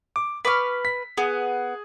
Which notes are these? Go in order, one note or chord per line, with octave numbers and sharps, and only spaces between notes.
D6
B4 C#6 D6 F6 B6
B6
B3 G#4